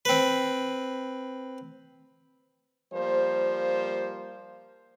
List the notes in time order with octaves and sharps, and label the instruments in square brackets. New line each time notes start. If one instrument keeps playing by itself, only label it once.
[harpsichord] C4 B4
[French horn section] F3 G3 A#3 C5